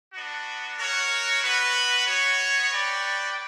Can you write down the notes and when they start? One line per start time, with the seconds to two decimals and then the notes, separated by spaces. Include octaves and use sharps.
0.13 B3 D4 F#4
0.77 F#4 A#4 C#5 F#5
1.42 B3 F#4 B4
2.06 B3 F#4 C#5
2.70 F#4 B4 D5 G5